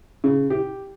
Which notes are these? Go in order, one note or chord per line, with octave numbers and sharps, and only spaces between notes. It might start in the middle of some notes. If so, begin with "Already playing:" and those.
C#3
G4